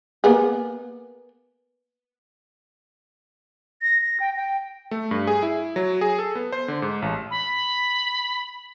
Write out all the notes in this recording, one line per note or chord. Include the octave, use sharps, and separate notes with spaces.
A#3 B3 G#4
A#6
A#6
G5
G5
A3
G2
G#4
E4
F#3
G#4
A4
B3
C5
D3
G#2
A1
B5